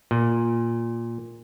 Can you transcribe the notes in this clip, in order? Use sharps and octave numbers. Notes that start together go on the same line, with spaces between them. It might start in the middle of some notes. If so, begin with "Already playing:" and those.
A#2